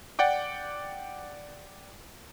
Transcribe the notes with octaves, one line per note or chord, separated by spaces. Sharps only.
D5 F#5 G5 D6